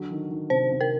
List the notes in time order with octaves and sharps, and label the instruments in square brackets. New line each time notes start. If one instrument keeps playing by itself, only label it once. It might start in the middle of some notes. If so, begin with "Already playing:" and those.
Already playing: [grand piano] D3 F#3
D#3
D#3
[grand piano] C3 [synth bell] C5
[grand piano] C3
[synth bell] A#4